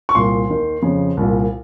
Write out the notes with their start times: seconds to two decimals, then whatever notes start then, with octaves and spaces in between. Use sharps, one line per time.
0.09 C#6
0.15 C2 A#2 C6
0.50 D#2 D#3
0.82 F2 C#3
1.17 C2 A#2